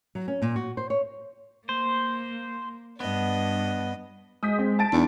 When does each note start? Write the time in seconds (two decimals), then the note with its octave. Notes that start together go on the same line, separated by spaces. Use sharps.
0.15 F#3
0.28 C#4
0.42 A#2
0.56 F#4
0.77 C5
0.90 C#5
1.69 A#3 C5
3.00 G2 B3 D4 D#5
4.43 G#3 D#6 G6 B6
4.58 C4
4.79 A5 A6 D7
4.92 E2 D4 D#4